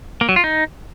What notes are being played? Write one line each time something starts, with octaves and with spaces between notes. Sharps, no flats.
A#3
F#3
F4
D#4